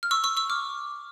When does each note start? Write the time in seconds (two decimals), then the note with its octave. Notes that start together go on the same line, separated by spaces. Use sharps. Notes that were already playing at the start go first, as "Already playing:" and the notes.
0.03 F6
0.11 C#6 E6
0.24 C#6 E6
0.37 C#6 E6
0.50 D6 F6